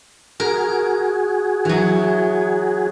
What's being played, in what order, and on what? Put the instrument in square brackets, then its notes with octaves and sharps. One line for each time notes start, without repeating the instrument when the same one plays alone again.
[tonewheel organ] F#4 G#4 [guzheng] A#4
[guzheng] E3 F#3